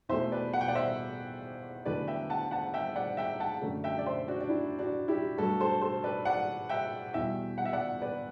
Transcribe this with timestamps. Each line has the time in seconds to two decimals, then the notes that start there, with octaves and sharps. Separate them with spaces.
0.09 E2 B2 A3 C5 E5
0.32 B4 D5
0.53 F#5
0.61 G5
0.68 D5 F#5
0.75 C5 E5
1.85 E2 D3 F#3 A3 B4 D5
2.07 E5 G5
2.30 F#5 A5
2.51 F#5 A5
2.74 E5 G5
2.96 D5 F#5
3.17 E5 G5
3.40 F#5 A5
3.62 F#2 D3 A3
3.84 E5 G5
3.98 D5
4.06 C5 E5
4.28 D4 F#4
4.40 D4
4.49 E4
4.79 D4 F#4
5.08 E4 G4
5.38 G2 F#3 A3 F#4 A4
5.60 A4 C5
5.82 A4 C5
6.03 B4 D5
6.25 D5 F#5
6.69 E5 G5
7.14 E2 B2 G3 E5 G5
7.58 F#5
7.65 E5
7.73 D5 F#5
8.02 B4 D5